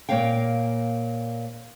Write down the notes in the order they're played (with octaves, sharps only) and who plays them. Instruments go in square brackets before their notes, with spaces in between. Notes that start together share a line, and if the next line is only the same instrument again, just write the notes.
[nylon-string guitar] A#2 E3 A#3 C#5 F5 G5